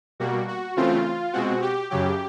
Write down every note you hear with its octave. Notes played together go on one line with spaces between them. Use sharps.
B2 G3 A#3 F#4
F#4
C#3 E3 A3 C4 F4
B2 G#3 C4 F#4
G4
F#2 C#3 F#3 G4